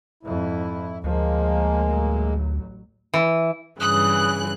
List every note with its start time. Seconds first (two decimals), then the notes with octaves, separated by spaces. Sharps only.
0.23 F2 G#2 E4
1.04 D2 F3 G#3 A#3
1.90 A1 F#3
3.14 E3
3.80 G2 C#3 E3 D#6 F#6